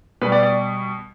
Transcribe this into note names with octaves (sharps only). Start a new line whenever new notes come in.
B2 G3 B4
D5
D5